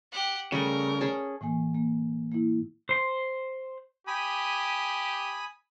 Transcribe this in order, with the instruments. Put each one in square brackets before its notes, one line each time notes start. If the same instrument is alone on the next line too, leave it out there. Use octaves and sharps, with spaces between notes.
[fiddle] G4 F#5
[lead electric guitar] C#3 [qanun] G3 A3 [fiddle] A#4
[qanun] C#4 G#4 A5
[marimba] A2 E3 A#3 G#5
A#3
A#3 E4
[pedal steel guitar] C5 C6
[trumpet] G4 [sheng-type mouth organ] G#5 B5 D#6